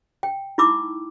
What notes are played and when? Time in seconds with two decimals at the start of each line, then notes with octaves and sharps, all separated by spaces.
0.23 G5
0.58 D#4 E4 B5 D6 E6